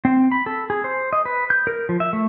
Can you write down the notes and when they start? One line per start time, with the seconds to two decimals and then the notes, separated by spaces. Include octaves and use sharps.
0.05 C4
0.32 B5
0.46 A4
0.70 G#4
0.84 C5
1.13 D#5
1.25 B4
1.50 G6
1.67 A#4
1.89 F3
2.00 E5
2.13 A3